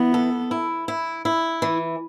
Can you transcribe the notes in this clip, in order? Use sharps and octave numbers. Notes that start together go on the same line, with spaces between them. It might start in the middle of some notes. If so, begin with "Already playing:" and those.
Already playing: E3 B3
A4
E4
E4
E4
E3